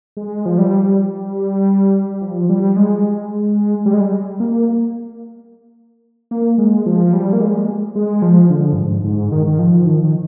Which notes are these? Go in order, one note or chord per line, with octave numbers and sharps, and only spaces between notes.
G#3
F3
G3
F3
G3
G#3
G3
G#3
G3
A#3
A#3
G#3
F3
G3
A#3
G#3
G#3
F3
D3
G2
G#2
G#2
D#3
D#3
F3
D#3
D#3